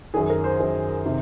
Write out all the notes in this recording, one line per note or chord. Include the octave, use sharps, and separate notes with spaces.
F#2 D#3 G#4
A#4
C5
F#2 D#3
C3 D#3